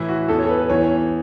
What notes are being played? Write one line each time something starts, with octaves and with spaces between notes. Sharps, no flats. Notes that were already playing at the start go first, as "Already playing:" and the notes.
Already playing: A2 E3 E4
F#4
E2 E3 A4
C#5
A4
B4
B4
E2 E3 C#5
C#5